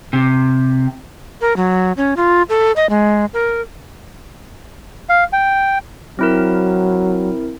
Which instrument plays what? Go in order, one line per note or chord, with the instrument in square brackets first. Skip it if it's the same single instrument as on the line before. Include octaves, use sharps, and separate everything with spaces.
[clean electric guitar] C3
[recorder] A#4
F#3
C#4
F4
A4
D#5
G#3
A#4
[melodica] F5
G5
[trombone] F#3 [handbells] C4 E4 A#4